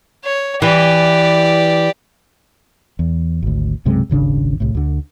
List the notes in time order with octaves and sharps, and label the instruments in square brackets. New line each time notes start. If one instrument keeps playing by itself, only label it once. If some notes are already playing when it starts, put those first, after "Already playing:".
[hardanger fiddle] C#5
[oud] E3 [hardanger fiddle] G4 D5
[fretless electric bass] E2
G#1 D2
B1 F#2 C3 G#3
D#1 G#1 C#3 D4
C2 A2
D2 D3